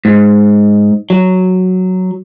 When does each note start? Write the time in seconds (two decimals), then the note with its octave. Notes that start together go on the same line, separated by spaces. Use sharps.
0.05 G#2
1.10 F#3